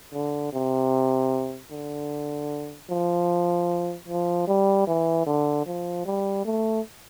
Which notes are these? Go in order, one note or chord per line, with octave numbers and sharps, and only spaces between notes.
D3
C3
D3
F3
F3
G3
E3
D3
F3
G3
A3